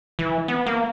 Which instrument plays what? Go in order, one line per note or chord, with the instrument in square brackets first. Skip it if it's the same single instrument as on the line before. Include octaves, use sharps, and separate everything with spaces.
[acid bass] E3
B3
A#3